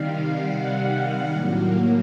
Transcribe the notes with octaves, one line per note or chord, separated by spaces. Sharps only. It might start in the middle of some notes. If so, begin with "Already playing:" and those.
Already playing: C3 D#3 G3 F5
F#5
A2 F#3 A#3